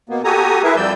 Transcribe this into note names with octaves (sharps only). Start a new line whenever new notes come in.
B2 A#3 B3
F#4 G4 A4 G#5 A#5 D#6
E4 G#4 A#4 B4 E5
F2 F3 G3 D5 E6 G6